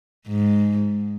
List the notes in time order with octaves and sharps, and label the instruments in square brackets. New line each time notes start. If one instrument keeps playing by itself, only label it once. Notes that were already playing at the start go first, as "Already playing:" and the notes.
[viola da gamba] G#2